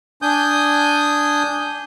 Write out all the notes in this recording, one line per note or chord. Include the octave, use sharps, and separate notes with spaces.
D4 G#5 D#6 G6